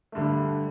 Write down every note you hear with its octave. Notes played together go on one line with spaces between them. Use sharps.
G2 D3 A3